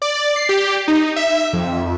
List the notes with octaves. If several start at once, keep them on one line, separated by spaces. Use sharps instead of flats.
D5
C7
G4
D#4
E5
F2